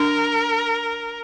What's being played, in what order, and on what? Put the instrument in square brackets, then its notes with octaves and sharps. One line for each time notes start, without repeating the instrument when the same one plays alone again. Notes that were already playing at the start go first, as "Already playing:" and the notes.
Already playing: [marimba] D4 [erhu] A#4